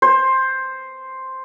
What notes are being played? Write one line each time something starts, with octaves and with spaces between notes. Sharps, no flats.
C5